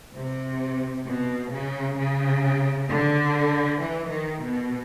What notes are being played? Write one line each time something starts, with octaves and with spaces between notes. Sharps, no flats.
C3
B2
C#3
C#3
D3
E3
D#3
B2